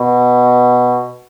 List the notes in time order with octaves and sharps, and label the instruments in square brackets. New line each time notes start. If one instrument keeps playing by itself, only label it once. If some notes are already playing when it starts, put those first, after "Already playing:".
Already playing: [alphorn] B2